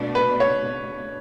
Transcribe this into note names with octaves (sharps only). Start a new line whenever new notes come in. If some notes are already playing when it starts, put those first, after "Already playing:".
Already playing: B2 A3 D4
B4
C#5